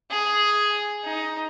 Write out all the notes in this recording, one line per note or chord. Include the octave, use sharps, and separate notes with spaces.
G#4
D#4